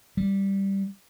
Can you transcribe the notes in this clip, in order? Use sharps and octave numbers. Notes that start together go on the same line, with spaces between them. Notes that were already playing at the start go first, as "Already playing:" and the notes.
G3